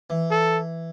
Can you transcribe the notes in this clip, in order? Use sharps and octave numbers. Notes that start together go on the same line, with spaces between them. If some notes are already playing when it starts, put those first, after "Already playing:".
E3
A4